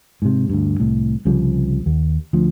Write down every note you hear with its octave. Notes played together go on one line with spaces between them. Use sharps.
G#2 C3
D2 G2
C2 A2
C2 C#3 F3 G3
D#2
D2 F3